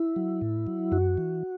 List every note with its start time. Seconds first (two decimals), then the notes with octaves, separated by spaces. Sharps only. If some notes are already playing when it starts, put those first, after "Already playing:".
Already playing: E4
0.16 F#3
0.41 A2
0.67 F#3
0.92 F#2 F#4
1.17 E3